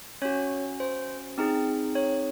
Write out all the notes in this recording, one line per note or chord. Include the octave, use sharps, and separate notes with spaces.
C#4 F#4 C#5
C5
C4 D#4 G#4
C#5